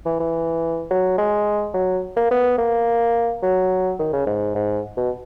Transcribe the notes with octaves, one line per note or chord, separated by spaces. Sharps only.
E3
E3
F#3
G#3
F#3
A#3
B3
A#3
F#3
D#3
C#3
G#2
G#2
B2